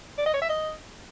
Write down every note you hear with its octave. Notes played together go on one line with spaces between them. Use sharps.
D5
D#5
C#5
E5
D#5